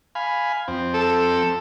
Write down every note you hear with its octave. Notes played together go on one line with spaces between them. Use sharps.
F5 G#5 B5
F2 C4
A4